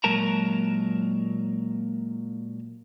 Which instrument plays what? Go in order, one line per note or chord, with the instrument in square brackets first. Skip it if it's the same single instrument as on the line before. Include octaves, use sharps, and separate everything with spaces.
[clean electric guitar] A#2 F#3 G#3 A#4 A5 A#5